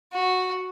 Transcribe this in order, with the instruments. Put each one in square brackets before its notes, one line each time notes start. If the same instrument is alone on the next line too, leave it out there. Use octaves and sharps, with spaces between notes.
[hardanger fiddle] F#4